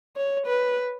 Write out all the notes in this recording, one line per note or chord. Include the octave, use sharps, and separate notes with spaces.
C#5
B4